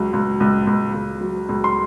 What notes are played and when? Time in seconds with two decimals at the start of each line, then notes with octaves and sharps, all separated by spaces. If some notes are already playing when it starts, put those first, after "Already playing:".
Already playing: C#2 F#3
0.13 C#2
0.40 C#2
0.67 C#2
0.94 C#2
1.21 F#3
1.49 C#2
1.64 C6